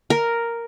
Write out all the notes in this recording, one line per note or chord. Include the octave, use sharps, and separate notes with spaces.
A#4